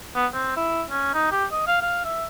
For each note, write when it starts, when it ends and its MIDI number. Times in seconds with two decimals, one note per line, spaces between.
0.15 0.27 59
0.34 0.55 60
0.56 0.83 64
0.90 1.12 61
1.14 1.30 63
1.31 1.45 67
1.51 1.63 75
1.67 1.78 77
1.81 2.00 77
2.05 2.26 76